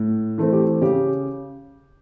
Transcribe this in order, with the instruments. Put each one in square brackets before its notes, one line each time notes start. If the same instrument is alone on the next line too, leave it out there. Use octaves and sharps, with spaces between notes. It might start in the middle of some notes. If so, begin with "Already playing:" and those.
Already playing: [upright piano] A2
E3 A3 C4
G4
C#3 G4